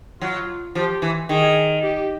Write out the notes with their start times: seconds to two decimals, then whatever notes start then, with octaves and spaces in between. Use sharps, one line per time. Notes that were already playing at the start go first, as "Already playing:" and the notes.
0.22 F#3 F4
0.75 F3 G4
1.02 E3
1.29 D#3 G#4
1.84 G4